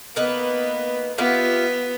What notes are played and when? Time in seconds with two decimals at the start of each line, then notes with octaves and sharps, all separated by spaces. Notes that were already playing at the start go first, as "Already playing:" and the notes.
0.16 A#3 B3 D#4 B4
1.18 B3 F4 G4 E5